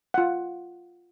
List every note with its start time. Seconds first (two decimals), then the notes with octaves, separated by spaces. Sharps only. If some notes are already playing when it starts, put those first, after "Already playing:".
0.14 F4 F#5